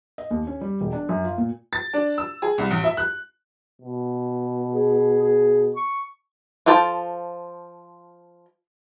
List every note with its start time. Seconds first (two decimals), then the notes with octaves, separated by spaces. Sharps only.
0.18 D#5
0.31 D#2
0.47 C#4
0.61 G3
0.81 E1
0.93 D4
1.09 F#2
1.24 F4
1.38 A#2
1.73 A6
1.93 D4
2.18 E6
2.42 G#4
2.58 C2
2.70 A1
2.84 E5
2.97 F#6
3.82 B2
4.73 G#4
5.22 G#4
5.76 C#6
6.66 F3 F4 A4 G5 A5